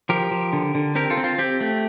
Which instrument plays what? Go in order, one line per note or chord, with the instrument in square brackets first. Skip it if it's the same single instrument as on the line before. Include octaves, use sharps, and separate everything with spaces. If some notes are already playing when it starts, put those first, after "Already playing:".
[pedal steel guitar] F3 G4 A#4
F3
D3
D3
C4 G4 A#4
F4 A4
C4
F4
C4 G4
A3